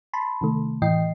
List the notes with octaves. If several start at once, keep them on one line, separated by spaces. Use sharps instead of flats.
A5 B5 C6
C3 D#3 A3
A2 E3 D#5 G5 C7